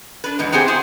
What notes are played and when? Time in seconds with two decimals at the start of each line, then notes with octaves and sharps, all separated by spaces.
0.24 D4 B4
0.39 E2 G#2 G#3
0.52 B3 C4 G4 G#4 C5
0.68 E4 F#4 G#4 C5